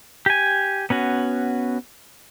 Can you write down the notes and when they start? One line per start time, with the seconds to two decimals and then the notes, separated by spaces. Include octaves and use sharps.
0.26 G4 G#5
0.90 B3 C#4 F#4